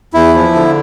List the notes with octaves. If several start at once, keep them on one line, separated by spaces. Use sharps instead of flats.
E2 E4
F3
D3